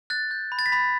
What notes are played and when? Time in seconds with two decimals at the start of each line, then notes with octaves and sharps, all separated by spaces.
0.10 F#6 A6
0.31 G6
0.52 B5
0.59 A6
0.66 B6
0.72 B5 A6